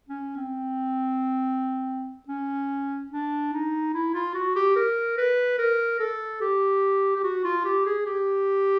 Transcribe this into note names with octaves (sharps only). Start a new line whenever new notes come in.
C#4
C4
C#4
D4
D#4
E4
F4
F#4
G4
A#4
B4
A#4
A4
G4
G4
F#4
F4
G4
G#4
G4